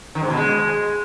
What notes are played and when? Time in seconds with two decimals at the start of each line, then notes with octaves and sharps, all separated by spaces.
0.15 D#3
0.23 G#2
0.30 B2
0.37 G#3